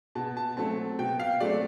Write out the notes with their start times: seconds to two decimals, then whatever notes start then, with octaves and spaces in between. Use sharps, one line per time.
0.15 B2 A5
0.37 A5
0.57 F#3 A3 C4 A5
0.99 B2 G5
1.20 F5
1.40 F#3 A3 C4 D5